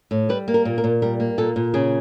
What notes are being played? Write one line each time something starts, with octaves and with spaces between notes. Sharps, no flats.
A2
G3 B4
A#3
A#4
A#2
A#4
A#2
G3 A#4
A#3
A#2 A4
A#2
C#3 G#4